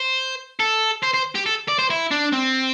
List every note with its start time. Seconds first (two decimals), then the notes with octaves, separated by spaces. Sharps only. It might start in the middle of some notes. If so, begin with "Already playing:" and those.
Already playing: C5
0.60 A4
1.03 C5
1.14 C5
1.35 G4
1.46 A4
1.68 D5
1.79 C5
1.90 E4
2.11 D4
2.33 C4